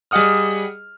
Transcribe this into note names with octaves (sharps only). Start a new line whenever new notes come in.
G3 G#4 D#5 F#5 D#6 F6